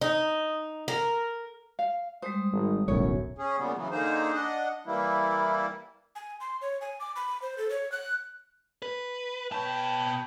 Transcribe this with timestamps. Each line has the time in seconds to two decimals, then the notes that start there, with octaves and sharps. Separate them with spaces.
0.02 D#4
0.88 A#4
1.79 F5
2.22 G3 G#3 C5 D#6
2.52 G#1
2.88 D1 B1 F#2 A2 C#5
3.38 C#4 G#4
3.58 A#2 C#3 G3 G#3 B3
3.76 C#3 E3 F#3
3.91 D3 A#3 D#4 G#4 C5
4.33 D4 D#5 F#5
4.87 E3 G3 A#3 E4
6.15 G#5
6.40 C6
6.61 C#5
6.81 G#5
7.00 D6
7.16 B5
7.42 C5
7.58 A4
7.70 C#5
7.92 F#6
8.82 B4
9.52 B2 B4 C#5 G5 A5